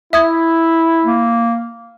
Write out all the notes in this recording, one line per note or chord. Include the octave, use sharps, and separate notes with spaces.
E4 E5 D#6 G#6
A#3